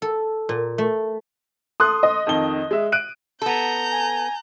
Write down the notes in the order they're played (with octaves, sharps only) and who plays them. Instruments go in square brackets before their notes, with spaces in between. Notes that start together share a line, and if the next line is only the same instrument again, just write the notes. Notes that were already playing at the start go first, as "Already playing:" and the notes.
[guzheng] A4
A#2
A3
[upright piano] A4 C6 F#6 [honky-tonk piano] D#6
[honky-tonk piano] D#5
[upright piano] F2 D#3 G7
G#3 E5
F#6 D7 D#7
[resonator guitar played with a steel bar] B3 A4 [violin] A#5 G6
[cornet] G#5